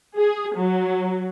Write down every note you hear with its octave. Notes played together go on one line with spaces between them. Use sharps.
G#4
F#3